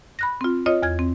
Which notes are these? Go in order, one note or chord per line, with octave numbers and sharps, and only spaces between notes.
B5 F#6 A#6
C4 F4
F4 C#5 D#5 D#6
E2 F6 G#6
C4